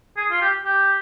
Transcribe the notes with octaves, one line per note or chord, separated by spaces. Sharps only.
G#4
F4
G4
G4